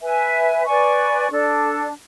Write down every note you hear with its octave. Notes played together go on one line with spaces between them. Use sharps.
B4 E5 G#5
B4 D5 G#5 C#6
D4 A4 D5